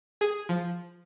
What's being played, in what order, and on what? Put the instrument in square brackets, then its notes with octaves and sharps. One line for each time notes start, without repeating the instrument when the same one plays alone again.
[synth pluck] G#4
F3